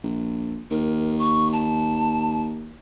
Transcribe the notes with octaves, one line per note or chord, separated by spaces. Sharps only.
A#1
D#2 A#4
C#6
A5